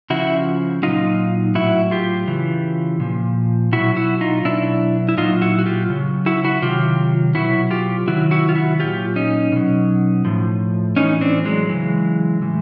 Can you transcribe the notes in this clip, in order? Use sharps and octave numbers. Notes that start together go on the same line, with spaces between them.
C#3 F3 E4 F#4
A#2 F#3 D#4 F4
A2 F#3 E4 F#4
F4 G4
C#3 E3
A#2 F3
B2 F#3 E4 F#4
E4 F#4
D#4 F4
B2 F#3 D4 E4
E4
A#2 F#3 D#4 F4
E4 F#4
F#4
F4 G4
C#3 F#3
E4 F#4
E4 F#4
C3 D#3 F#3 F4 G4
B2 F#3 E4 F#4
F4 G4
C3 D#3 F#3 E4 F#4
E4 F#4
F4
E4 F#4
A#2 F#3 F4 G4
C#4 D#4
B2 F#3
A2 F3
A2 E3 C#4 D#4
C4 D4
F#3 G#3
C#3 E3
A2 E3